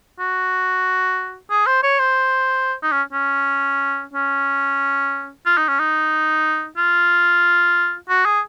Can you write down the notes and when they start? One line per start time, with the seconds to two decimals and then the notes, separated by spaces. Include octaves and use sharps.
0.19 F#4
1.51 G#4
1.67 C5
1.83 C#5
2.00 C5
2.83 D#4
2.92 C#4
3.13 C#4
4.13 C#4
5.46 F4
5.57 D#4
5.68 C#4
5.80 D#4
6.77 F4
8.09 F#4
8.26 G#4